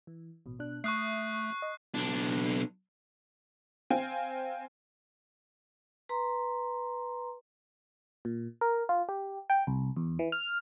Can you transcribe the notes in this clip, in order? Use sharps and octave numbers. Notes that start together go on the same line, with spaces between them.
E3
A1 B2
B2 D4 F#6
A3 E5 C#6 D#6 F#6 C7
D#5
B1 D4
C4 F5 G5 G#5
B4 A#5 C6
A#2
A#4
F4
G4
G5
C2
E2
E3
F6